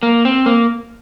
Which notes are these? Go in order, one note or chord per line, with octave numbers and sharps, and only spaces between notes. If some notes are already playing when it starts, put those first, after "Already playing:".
A#3
C4
A#3